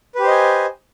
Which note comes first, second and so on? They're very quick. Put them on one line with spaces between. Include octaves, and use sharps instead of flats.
B4 G4 C5 D#5 G#5